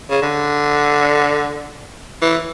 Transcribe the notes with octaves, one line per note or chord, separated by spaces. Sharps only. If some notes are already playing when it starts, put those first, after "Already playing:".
C#3
D3
E3